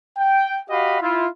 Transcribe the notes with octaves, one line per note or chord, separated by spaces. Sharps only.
G5
F#4 G4 D#5 F5 B5
E4 F4